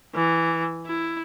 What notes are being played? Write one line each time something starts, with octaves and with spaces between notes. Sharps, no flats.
E3
E4